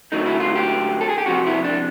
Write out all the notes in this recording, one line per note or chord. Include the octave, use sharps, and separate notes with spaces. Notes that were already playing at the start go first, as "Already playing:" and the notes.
F#2 D3 F#3 A3 D#4
E4
F4
G4
A4
G#4
G4
F2 C3 F3 F#4
E4
D4